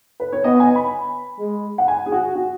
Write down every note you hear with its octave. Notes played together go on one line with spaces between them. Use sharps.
B4
C#5
B3 D#5
G#5
B5
G#3
F#5
G#5
G#4
F#4
F#4